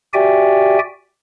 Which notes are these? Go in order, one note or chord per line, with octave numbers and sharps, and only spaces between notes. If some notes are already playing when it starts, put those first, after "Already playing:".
F#4 G4 D5 E5 G5 G#5